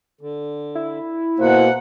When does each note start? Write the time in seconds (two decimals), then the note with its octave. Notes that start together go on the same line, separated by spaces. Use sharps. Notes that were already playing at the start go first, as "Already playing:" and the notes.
0.21 D3
0.75 E4
1.39 B2 A#3 C5 F#5